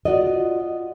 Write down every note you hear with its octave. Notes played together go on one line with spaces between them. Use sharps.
F4 F#4 D5 D#5